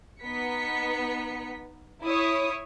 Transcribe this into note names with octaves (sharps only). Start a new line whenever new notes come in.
B3 D#4 B6 C#7
E4 C#5 D#6